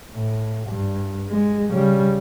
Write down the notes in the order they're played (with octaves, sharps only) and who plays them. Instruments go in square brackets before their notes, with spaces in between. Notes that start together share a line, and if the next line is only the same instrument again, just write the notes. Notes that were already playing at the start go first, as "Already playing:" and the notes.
[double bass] A2
G2
G#3
C#3 G3